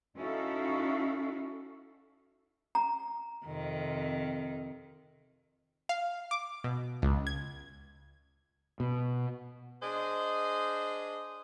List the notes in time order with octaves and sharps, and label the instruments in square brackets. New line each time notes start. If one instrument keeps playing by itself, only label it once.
[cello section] C#4 D#4 E4 F#4 A4 F5
[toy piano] A#5
[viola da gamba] F2 C3 D#3
[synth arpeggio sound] F5
D6
B2
C#2
G#6
[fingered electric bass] B2
[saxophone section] D4 G#4 C5 D#5